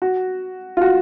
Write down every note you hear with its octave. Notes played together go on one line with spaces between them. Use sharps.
F#4
F4
F#4